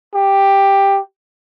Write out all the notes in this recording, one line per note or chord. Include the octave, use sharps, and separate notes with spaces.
G4